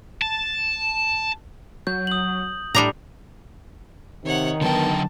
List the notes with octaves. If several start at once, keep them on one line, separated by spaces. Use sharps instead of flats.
A5
F#3 G6
D#6 F#7
A2 G3 D4 A#5
C3 D#3 D#4 C#5 F#5
D3 F#3 B3 G5 A5